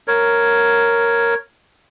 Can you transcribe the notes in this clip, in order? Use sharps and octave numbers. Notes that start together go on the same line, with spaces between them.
A#4 C#5